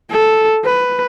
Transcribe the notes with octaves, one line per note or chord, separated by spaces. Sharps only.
A4
B4